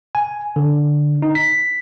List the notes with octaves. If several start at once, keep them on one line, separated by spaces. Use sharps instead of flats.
G#5
D3
D#4
B6